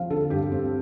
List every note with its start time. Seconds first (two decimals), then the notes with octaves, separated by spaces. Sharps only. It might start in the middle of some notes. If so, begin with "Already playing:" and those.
Already playing: F3 C4 F5
0.10 D3 A4
0.30 G2 G4
0.52 C4